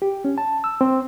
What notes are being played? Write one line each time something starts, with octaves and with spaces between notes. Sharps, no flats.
G4
C#4
A5
E6
C4